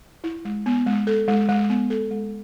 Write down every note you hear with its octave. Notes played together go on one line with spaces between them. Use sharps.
E4
G#3
B3
G#3
A4
G#3
G#3
B3
A4
G#3